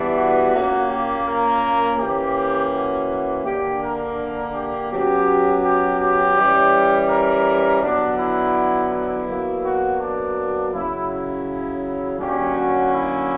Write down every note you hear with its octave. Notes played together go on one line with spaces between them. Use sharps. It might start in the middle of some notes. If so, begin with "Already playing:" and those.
Already playing: E3 G3 B3 D4
F#4
A#2 A#3 C#4
G4
A#4
E3 A#3 C#4 G4
F#4
D3 A#3 D4 G4
A#4
G4
B2 F#3 C#4 G4
G4
G4
E3 G3 C#4
A#4
D3 F#3 B3 D4
E4
E4
B2 F#3 A#3
F#4
D4
C#3 F#3 C#4 E4
E4
D3 F#3 A#3 C#4 G4
F#4
E4